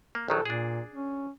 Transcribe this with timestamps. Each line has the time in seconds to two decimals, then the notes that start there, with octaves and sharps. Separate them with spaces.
0.15 A#3
0.28 A#1 D#3 F#3 A4
0.45 A#2 D4 G#4
0.93 C#4